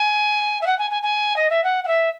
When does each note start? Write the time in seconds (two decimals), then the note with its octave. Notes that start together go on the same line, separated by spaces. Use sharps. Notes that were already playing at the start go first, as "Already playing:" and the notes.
Already playing: G#5
0.61 E5
0.66 F#5
0.79 G#5
0.90 G#5
1.02 G#5
1.36 D#5
1.50 E5
1.64 F#5
1.84 F#5
1.87 E5